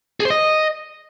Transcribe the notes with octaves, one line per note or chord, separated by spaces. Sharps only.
G#4
C5
D#5